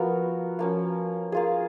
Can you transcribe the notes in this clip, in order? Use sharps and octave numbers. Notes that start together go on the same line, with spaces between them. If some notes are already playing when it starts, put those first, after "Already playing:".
Already playing: F3 B3 F#4 A#4
F3 A#3 C#4
A#3 F4 G#4